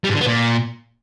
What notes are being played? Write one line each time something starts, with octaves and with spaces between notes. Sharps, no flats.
G3
G#2
D3
B3
A#2